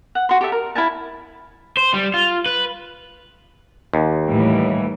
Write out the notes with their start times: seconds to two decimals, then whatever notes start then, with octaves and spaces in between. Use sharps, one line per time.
0.15 F#5
0.29 F#4 C6
0.41 G4 A4 E5
0.52 A#4
0.75 E4 F5 G#5 A5
1.77 C5
1.94 G3
2.14 F4
2.46 B4
3.94 D#2
4.27 A2 E3 G3